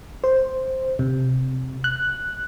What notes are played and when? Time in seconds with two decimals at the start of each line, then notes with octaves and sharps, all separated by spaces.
0.24 C5
0.99 C3
1.84 F#6